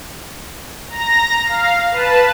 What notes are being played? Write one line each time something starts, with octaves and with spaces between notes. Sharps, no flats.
A#5 A#6
F5
B4 A5